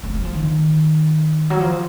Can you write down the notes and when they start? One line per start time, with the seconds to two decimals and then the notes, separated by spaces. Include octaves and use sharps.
0.04 A3
0.14 F#3
0.25 F3
0.34 D#3
1.50 F#3
1.60 F3